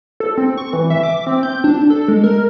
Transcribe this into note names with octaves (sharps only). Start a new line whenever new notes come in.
A4
C4
C#6
E3
E5
D6
C4
G6
D4
A4
G#3
A#4